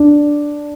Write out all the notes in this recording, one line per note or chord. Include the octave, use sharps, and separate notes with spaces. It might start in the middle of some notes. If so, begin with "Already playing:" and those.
Already playing: D4